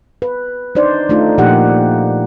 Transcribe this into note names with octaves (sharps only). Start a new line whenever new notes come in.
B4
D4 D#4 C5 D5
A3 D4 D#4 F4
A#2 F3 A#3 D#4 G4 F#5